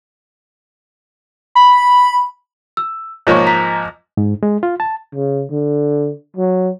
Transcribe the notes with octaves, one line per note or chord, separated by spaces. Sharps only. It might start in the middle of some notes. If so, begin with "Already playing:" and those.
B5
E6
G#2 F3 A#3 C#5 C#6
A#5 B6
G#2
G#3
F4
A5
C#3
D3
F#3